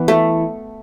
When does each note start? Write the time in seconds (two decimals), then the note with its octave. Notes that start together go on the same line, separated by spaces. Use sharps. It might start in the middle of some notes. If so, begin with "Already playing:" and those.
Already playing: E3 B3
0.08 A3